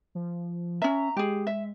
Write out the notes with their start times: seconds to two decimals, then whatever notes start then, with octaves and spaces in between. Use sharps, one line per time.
0.15 F3
0.82 C#4 E5 A#5
1.17 G#3 G4 G#4
1.47 E5